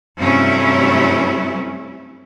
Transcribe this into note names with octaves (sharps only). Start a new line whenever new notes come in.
G2 C3 F#3 A3 C#4 E4